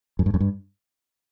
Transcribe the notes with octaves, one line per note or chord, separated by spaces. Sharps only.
F#2
G2
F#2
G2